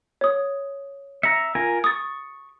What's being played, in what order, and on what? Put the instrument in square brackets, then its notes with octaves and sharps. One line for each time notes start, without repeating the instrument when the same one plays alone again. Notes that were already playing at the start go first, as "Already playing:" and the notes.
[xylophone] C#5 D#6
[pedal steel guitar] E5 A#5 [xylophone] C#7
[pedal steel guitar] F4 A#4 G#5
[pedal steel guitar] C#6 [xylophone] D#6 A6